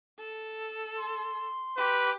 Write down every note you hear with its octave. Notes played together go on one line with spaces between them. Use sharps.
A4
C6
G4 B4